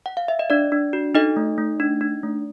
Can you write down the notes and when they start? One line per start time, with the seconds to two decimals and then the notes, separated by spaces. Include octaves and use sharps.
0.06 F#5
0.17 F5
0.28 E5
0.39 D#5
0.50 D4 D5
0.72 D4
0.93 F#4
1.15 D#4 A4 D#5
1.36 A3
1.58 A3
1.80 D4
2.01 D4
2.23 A3